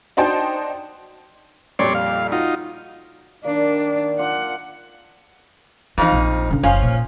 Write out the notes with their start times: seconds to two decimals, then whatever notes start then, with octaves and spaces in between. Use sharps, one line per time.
0.17 D4 D#4 F#4 C5 G5 A5
1.79 F2 A#2 G3 C#5 D5 C6
1.95 F5
2.32 D#4 F4 F#4
3.44 D#3 A#3 D4 D5
4.19 D4 F4 F#5
5.98 F2 E3 F3 D#4
6.12 A#1
6.51 D3 C#4
6.63 F#1 F3 C#4 F4
6.82 A#2